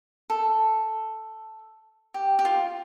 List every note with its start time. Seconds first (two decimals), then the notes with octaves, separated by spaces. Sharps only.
0.30 A4
2.14 G4
2.39 G4
2.45 F4